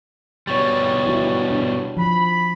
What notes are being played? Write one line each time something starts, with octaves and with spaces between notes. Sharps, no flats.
B2 G3 C#5 C#6 A6
E4 F#4
D4
F3 B5